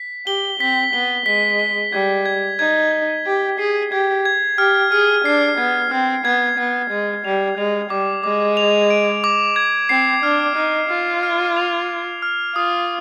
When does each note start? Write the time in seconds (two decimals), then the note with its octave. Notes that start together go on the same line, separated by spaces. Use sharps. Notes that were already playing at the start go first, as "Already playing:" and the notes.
Already playing: B6
0.26 G4 G7
0.60 C4 B6
0.93 B3 G7
1.26 G#3 B6
1.59 G7
1.93 G3 G#6
2.26 G#6
2.59 D#4 G#6
2.92 G#6
3.25 G4 G#6
3.58 G#4 C7
3.92 G4 G#6
4.25 G#6
4.58 G4 F6
4.91 G#4 F6
5.25 D4 C7
5.58 B3 G#6
5.91 C4 F6
6.25 B3 G#6
6.58 B3 G#6
6.91 G#3 G#6
7.24 G3 F7
7.58 G#3 F7
7.90 G3 D6
8.24 G#3 D6
8.57 F7
8.90 D7
9.24 D6
9.56 G#6
9.89 C4 C7
10.23 D4 F6
10.56 D#4 F6
10.89 F4 F6
11.23 F6
11.57 F7
11.89 F6
12.22 F6
12.55 F4 D#6